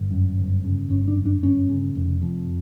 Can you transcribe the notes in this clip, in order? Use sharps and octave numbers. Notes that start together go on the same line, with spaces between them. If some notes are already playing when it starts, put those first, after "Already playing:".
Already playing: G1
F#2
G1
C#3
G1 C#4
D4
F#2
D4
G1 C#4
C#3
F1
F2